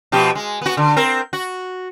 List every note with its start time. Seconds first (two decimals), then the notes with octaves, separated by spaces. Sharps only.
0.12 B2 F3 G4
0.35 G#3
0.61 B3 F#4
0.77 D3
0.96 C4 A#4
1.33 F#4